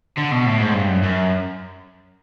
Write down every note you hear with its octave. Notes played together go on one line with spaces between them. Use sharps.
D3
B2
A2
G#2
G2
F#2
F#2